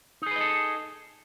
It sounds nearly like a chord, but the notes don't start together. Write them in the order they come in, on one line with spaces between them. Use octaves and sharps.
D#4 G#4 B4 D#5 A4